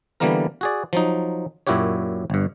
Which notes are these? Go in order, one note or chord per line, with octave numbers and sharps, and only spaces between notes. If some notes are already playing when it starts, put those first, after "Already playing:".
D3 E3 G3 A#3 B3 A#4
F#4 G#4 D5
F3 F#3 D#4
F#2 A#2 E4 F#4 G4 C#5
G1 G2